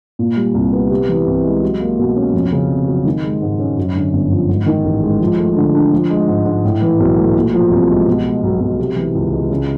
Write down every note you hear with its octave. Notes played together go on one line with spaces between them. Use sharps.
A#2
G3
C2
B3
C3
E3
C2
G#3
F#3
A#3
B2
C#4
F2
C#3
F1
F#3
D#3
G#3
G#2
C#4
F#2
D3
G1
F3
G#2
D#3
A1
G#3
F3
A3
D3
D4
F3
G#3
G#2
G#2
A2
E3
B1
A3
A#2
F3
C2
G#3
B2
G#3
B1
B1
C3
E3
C#2
G#3
C#3